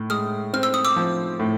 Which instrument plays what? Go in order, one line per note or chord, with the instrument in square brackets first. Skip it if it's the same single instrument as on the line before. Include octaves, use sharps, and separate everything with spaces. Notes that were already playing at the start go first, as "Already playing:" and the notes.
Already playing: [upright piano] A2
[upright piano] G#3 [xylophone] D#6 F6
[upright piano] C4 [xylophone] F6
[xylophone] E6
D#6
D6 E6
[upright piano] F3
A2